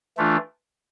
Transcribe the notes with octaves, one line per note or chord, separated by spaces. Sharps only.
E3 A3 D4 F4